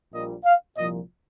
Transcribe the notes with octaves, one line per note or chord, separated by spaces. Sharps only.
A#1 A#2 G3 D#5
F5
C2 A#2 F3 D#5